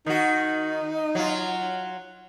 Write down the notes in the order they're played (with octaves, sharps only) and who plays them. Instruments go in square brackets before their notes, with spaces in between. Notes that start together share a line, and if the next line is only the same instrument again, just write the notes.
[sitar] D#3 F#4 [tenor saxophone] D#4
[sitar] F#3 F4